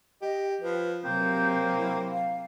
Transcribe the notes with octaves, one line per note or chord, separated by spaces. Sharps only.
G4 D#5
F3 B4
C3 F#3 A#3 C4 G6
E4
F5